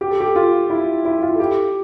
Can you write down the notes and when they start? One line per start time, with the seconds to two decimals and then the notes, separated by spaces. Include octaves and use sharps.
0.01 G4
0.10 A4
0.20 G4
0.36 F4
0.70 E4
1.05 E4
1.22 F4
1.35 A4
1.40 G4